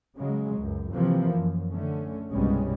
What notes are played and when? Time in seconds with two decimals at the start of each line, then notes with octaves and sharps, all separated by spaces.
0.17 C#3 F#3 G#3
0.60 C#2 F#2
0.93 C3 E3 F3 A#3
1.35 F#2
1.71 D3 A3 C#4
2.31 C2 G2 B2 G3 G#3 C#4